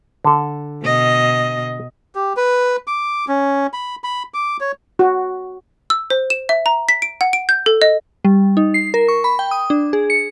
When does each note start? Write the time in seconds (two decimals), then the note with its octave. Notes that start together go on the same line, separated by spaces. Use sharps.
0.25 D3 A4
0.83 B2 D#5
2.15 G4
2.37 B4
2.87 D6
3.28 C#4
3.73 B5
4.04 B5
4.34 D6
4.61 C#5
4.99 F#4
5.90 E6
6.10 C5
6.30 E7
6.49 E5
6.66 A#5
6.89 B6
7.02 D7
7.21 F#5
7.33 D7
7.49 G6
7.66 A4
7.82 D#5
8.25 G3
8.57 D#4
8.74 C7
8.94 A#4
9.08 C#6
9.24 B5
9.39 G5
9.51 D#6
9.70 D4
9.93 G#4
10.10 C#7